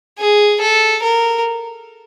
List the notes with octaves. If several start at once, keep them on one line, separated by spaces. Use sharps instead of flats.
G#4
A4
A#4